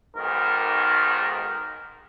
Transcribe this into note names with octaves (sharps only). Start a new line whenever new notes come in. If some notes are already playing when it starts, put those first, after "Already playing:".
B1 G#2 D#3 A#4